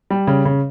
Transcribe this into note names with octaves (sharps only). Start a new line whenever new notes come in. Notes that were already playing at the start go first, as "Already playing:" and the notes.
G3
C#3
C#3